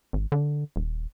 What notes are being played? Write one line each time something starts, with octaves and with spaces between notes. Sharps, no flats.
G#1
D3
D#1